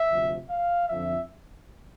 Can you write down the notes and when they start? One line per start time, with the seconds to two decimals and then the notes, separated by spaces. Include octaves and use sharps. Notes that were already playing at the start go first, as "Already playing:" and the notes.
Already playing: E5
0.10 D2 C3 F3
0.50 F5
0.89 F2 D3 F3 E5